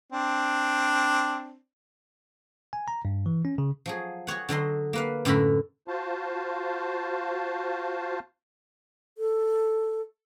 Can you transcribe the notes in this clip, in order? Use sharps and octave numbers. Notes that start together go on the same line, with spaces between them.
C4 D4
G#5
A#5
G2
E3
C#4
C#3
F3 F#3 G#4
F#4 G#4 C#5 F#5
D3 F#3 D#5 C6
A#3 B4 F5
F#2 A2 D3 A#4 B5
F4 F#4 C5 F5 A5
A4